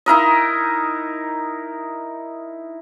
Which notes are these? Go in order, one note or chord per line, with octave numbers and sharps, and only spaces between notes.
D#4 E4 A#4 D#5